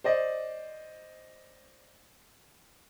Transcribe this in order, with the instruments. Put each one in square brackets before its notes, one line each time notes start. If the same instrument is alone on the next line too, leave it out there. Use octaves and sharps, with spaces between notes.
[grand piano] C5 D5 D#5